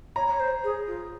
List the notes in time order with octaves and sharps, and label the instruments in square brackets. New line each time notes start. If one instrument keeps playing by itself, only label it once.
[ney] C#5 [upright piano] A#5
[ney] C#5
C5
G#4
F4